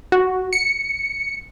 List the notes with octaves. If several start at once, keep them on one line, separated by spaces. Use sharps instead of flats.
F#4
C#7